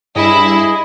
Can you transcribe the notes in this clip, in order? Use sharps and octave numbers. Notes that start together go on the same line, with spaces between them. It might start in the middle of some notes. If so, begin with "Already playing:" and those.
G2 E4 G#4 D#5 D#6